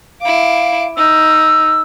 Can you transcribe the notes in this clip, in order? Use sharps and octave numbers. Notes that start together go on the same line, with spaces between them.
E4 F5 D6
D#4 E6